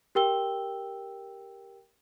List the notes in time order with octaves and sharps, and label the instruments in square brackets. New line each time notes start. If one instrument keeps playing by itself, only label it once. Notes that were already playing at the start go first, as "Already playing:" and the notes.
[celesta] G4 A#4 G5 E6 G7